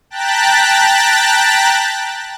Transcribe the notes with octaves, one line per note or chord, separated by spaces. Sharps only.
G5 A5 A#5 F#6 A6 B6